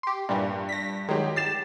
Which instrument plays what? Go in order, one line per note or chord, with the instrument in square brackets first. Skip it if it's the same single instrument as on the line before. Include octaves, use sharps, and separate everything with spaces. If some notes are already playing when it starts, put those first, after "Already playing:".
[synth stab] G4 C6
[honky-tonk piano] G2 [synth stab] A#2 E3 G3
[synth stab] A#6 B6
[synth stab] D#3 F#3 [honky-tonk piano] G#3 G4
[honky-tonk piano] G4 A6 E7 [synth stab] C7